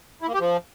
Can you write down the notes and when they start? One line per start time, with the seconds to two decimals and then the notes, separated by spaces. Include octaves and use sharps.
0.22 E4
0.28 A#3
0.34 G4
0.40 F3